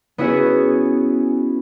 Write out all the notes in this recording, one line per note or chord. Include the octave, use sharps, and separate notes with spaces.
B3 C#4 E4 F#4 G#4 C#5